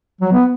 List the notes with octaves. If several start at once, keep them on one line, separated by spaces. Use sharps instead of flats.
F#3
B3